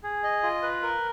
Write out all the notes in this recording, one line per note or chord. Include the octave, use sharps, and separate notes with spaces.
G#4
D#5
F4
B4
A#4